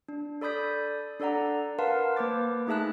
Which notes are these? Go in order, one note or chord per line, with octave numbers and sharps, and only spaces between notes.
D4
A4 D5 B5 D#6 G6 B6
D4 A4 D5 F#5 A#5
A#4 B4 F5 F#5 A5 C6
A#3 B4 C5 D6 A6
A3 D#4 G#4 E5 A5 F#6